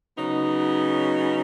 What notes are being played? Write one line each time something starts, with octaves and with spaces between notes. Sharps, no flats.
C#3 F#3 B3 D#4